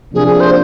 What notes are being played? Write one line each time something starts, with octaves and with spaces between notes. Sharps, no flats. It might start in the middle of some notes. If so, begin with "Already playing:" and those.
C3 F3 A#3 D4 G#4
G#4
C5